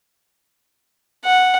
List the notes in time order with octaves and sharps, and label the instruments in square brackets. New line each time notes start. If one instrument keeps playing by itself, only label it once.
[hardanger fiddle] F#5